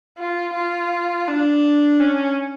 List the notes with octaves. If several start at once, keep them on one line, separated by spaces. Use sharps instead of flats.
F4
F4
D4
C#4